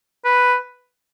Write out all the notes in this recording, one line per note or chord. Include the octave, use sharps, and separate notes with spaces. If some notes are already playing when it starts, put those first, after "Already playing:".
B4